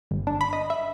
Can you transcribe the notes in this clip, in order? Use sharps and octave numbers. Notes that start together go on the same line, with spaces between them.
G1
D4
B5
D#5
E5